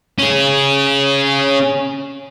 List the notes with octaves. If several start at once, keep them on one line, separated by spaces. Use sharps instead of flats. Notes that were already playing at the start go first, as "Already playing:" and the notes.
C#4 G#4